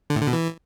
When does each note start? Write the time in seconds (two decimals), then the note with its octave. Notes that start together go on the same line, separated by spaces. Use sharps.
0.10 D3
0.16 A2
0.22 D3
0.27 B2
0.33 E3